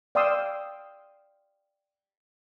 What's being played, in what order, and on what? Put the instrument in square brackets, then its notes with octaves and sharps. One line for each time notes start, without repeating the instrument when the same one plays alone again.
[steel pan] D5 F5 G5 C6 D#6 E6